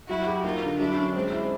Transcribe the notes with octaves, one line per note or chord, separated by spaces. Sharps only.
F#3 E4 F#4
G4
A#3 D#4 F4
D3
F#3 D4 E4
C#4
G#3 C4 D4
E4